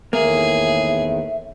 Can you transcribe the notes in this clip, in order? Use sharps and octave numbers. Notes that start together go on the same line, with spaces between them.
E2 A2 D#3 A#3 G#4 E5